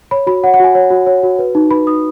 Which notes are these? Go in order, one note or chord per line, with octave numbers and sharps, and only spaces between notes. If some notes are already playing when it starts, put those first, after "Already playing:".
C#5 B5
F#4 B5
C#5 F#5
F#5
F#4 G#5
C#5
F#4
C#5
F#4
B4
D#4
B4 B5
D#4 D#6